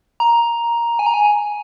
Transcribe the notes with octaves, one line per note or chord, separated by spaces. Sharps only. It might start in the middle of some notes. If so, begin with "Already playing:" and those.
A#5
G#5
A#5
G#5